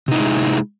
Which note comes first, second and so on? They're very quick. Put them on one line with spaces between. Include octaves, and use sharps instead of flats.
C3 D#4 E4 G#3